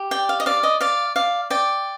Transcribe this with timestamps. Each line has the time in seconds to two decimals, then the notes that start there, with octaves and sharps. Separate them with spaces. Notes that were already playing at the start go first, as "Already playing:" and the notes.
Already playing: G4
0.11 D5 G5
0.29 F5
0.40 D#5
0.46 D5 F5
0.63 D#5
0.81 D5 F5
1.16 D5 F5
1.50 D5 G5